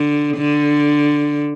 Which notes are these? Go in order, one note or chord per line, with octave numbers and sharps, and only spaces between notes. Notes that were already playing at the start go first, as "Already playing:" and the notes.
Already playing: D3
D3